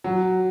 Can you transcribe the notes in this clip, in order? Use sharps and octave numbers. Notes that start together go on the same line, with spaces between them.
F#3